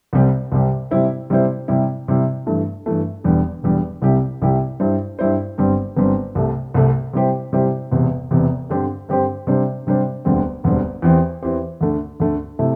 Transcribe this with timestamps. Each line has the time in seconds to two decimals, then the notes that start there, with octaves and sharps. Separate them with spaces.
0.13 C2 C3 G3 C4 G4
0.52 C2 C3 G3 C4 G4
0.91 C3 G3 E4 C5
1.30 C3 G3 E4 C5
1.68 C3 G3 E4
2.08 C3 G3 E4
2.47 G2 E3 A3
2.86 G2 E3 A3
3.24 E1 E2 D3 G3
3.63 E1 E2 D3 G3
4.02 C2 C3 G3 E4 G4
4.42 C2 C3 G3 E4 G4
4.80 G2 G3 E4 C5
5.19 G2 G3 E4 C5
5.58 G1 G2 G3 C4
5.97 G1 G2 G3 C4
6.35 C2 C3 A3
6.74 C2 C3 A3
7.13 C3 G3 E4 G4 C5
7.53 C3 G3 E4 G4 C5
7.91 E1 E2 C3
8.31 E1 E2 C3
8.69 G2 D3 C4 G4 C5
9.09 G2 D3 C4 G4 C5
9.47 C3 G3 D4 C5
9.87 C3 G3 D4 C5
10.25 E1 D2 D3 G3 C4
10.64 E1 D2 D3 G3 C4
11.02 E2 E3 C4 G4
11.42 E2 E3 C4 G4
11.81 D2 D3 A3
12.20 D2 D3 A3
12.59 C3 A3 E4